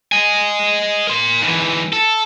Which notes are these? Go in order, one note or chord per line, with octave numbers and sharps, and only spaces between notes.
D#5 G#5
A#4 C6
G#2 E3
A4